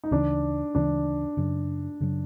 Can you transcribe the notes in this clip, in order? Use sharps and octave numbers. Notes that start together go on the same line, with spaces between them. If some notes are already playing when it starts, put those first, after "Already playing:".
D#4
D2 C#3 E3 D4
D2 C#3 E3 D4
F#2 C#3 F#3
F#2 C#3 F#3